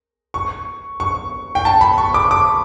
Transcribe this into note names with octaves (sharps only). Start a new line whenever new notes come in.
C#6
C#6
G5
A5
B5
C#6
D6
D6